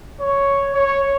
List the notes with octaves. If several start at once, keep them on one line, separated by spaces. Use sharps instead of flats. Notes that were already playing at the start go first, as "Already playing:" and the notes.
C#5
C#5